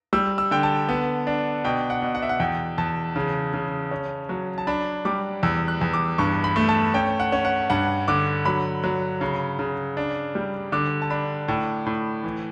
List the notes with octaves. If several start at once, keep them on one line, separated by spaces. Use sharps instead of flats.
G3 E6
E6
D3 G5
A5
B3
D4
B2 G5
F#5
B2
F#5
E5
F#5
E2 G5
E2 A5
C#3
C#3
C#4
F#3
A5
D4 B5
G3 D6
E2 E6
F#6
E2
D6
G2 C#6
B5
A3
A5
C#4 G5
F#5
C#4
F#5
G2 F#5
D3 D6
F#3 B5
F#3
C#3
C#3
D4
G3
D3 D6
A5
D4 B5
A2
A2
E3